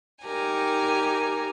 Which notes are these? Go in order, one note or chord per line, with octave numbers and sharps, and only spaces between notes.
D#4 G4 A#4 G#5 A#5